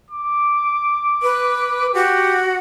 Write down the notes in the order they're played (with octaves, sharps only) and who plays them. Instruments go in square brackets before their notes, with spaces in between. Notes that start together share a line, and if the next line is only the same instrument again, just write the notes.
[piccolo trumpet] D6
[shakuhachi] B4
[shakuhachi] F#4 [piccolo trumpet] G4